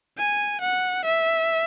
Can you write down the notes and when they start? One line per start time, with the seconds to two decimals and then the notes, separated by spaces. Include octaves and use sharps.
0.18 G#5
0.61 F#5
1.05 E5